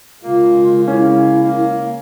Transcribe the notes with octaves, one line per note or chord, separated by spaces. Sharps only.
C#3 G#3 A#3 F4
C#4 E4
A#3